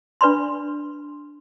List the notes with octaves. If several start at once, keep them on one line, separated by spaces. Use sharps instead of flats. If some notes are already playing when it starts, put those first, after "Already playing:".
D4 B4 D5 B5 C6